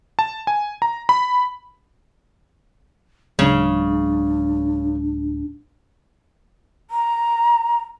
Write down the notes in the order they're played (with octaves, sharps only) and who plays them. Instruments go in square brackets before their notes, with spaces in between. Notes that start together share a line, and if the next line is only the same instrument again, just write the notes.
[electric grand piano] A5
G#5
A#5
B5
[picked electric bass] D1 F#3 G#3 [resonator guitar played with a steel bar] C#3 [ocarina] D4
[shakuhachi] A#5